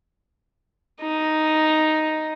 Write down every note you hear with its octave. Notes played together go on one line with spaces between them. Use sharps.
D#4